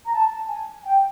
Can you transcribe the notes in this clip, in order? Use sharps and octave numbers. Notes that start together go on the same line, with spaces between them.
A#5
A5
G#5
G5